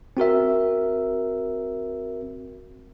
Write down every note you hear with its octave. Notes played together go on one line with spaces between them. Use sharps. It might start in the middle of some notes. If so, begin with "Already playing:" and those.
C4 F#4 A#4 E5